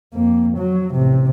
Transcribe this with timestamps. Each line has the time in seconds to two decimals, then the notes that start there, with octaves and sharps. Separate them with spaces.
0.14 F2 A#3
0.58 F#3
0.94 A1 C3